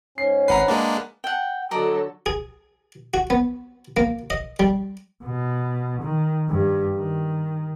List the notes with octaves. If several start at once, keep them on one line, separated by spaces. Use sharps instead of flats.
G#2 C#4 C7
G#1 B4 F#5 A#5 C7
G#3 A#3 D4
F#5 G5
D3 F#3 A4 D5 D#5 A#5
G#4
F#4
B3
A#3
D#5
G3
B2
D#3
G2
D#3